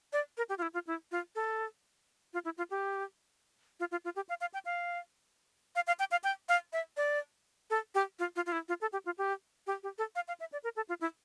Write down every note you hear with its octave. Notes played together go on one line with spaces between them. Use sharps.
D5
A#4
G4
F4
E4
F4
E4
F4
A4
F4
E4
F4
G4
F4
F4
F4
G4
F5
F5
G5
F5
F5
F5
G5
F5
G5
F5
E5
D5
A4
G4
F4
F4
F4
E4
F4
A4
G4
F4
G4
G4
G4
A4
F5
F5
E5
D5
A#4
A4
F4
E4